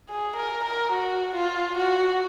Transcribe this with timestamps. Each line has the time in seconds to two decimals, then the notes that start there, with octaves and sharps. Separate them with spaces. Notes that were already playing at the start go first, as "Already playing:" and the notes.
0.09 G#4
0.36 A#4
0.64 A#4
0.92 F#4
1.35 F4
1.78 F#4